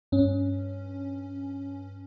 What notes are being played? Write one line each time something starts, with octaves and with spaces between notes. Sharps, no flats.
G2 C#4